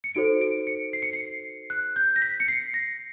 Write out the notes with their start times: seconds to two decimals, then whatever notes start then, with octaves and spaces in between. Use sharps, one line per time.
0.04 C#7
0.15 D#4 F#4 A4 C5 D7
0.41 D7
0.67 C#7
0.93 C7
1.02 C#7
1.13 C7
1.70 F#6
1.96 G6
2.16 A#6
2.22 B6
2.40 C#7
2.48 C7
2.74 A#6